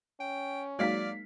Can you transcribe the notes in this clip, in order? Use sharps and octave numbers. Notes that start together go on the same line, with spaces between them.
C#4 G5
F#3 G#3 A#3 D#4 D5 F5 B6